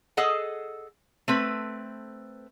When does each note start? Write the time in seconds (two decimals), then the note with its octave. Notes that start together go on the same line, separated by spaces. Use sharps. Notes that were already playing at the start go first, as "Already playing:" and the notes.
0.17 G#4 A4 D#5 F#5
1.28 A3 C4 B4